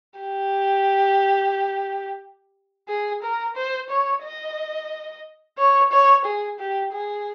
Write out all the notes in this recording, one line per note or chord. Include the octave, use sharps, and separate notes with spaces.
G4
G#4
A#4
C5
C#5
D#5
C#5
C#5
G#4
G4
G#4